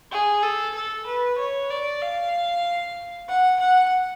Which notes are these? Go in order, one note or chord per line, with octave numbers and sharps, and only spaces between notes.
G#4
A4
A4
B4
C#5
D5
F5
F#5
F#5